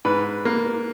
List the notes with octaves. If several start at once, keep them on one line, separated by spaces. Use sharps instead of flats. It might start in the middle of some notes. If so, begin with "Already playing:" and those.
G#2 B4
A#3